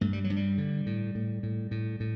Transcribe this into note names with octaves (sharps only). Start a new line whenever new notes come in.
G2 A3
G3
F#3
G2
G3
D3
A2
A2
A2
A2
A2